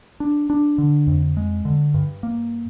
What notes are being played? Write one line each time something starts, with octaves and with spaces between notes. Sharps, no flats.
D4
D4
D3
F2
G#3
D3
G2
A#3